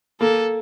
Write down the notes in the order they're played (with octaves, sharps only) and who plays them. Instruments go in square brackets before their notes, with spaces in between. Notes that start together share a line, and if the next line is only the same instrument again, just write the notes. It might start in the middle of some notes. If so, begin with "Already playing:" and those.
[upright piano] A#3 [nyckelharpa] A4